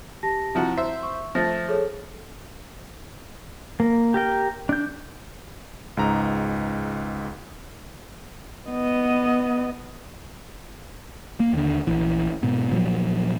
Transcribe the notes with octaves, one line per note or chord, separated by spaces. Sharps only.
G4 A5 A#6
C3 F3 E4 F#4 A#5
C5 E5
C#6
F3 A3 C5 A6 A#6
G#4 A4 C#5
A#3
G4 A#4 G5
D4 G6
C#2 G#2 A#5
B3 D#5
A#3
D#2 D3
A#1 E3
G#2 B2
A#2 F3 F#3